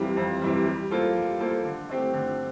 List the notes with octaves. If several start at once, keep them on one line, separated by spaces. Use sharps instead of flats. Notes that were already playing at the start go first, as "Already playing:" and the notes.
Already playing: F2 C3 E3 G3
F2
C3 E3 G3
G3
A#3 F4 A4 C5
G3
A#3 F4 A4 C5
D3
A3 C4 G4
D3